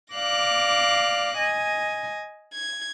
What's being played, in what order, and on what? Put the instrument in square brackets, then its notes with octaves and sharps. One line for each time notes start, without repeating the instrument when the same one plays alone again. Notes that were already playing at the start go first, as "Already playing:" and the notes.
[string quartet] D5 F5 D6 F#6 A#6
D#5 G#5
G#6